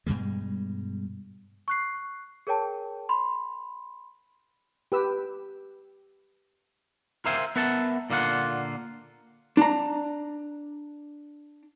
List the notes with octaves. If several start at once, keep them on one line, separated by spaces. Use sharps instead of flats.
G2 B2 G3 G#3
C#6 F#6 C7
G#4 A#4 C#5 G5 A5
B5 C6
G4 B4 E6
A#4 C5 E5 F5 G5 G#5
B3 A#4 E5 F#5 A5
A#2 D3 A#3 F4 F#5
D4 A#5